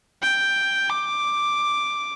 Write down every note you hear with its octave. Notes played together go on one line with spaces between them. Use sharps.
G5
D6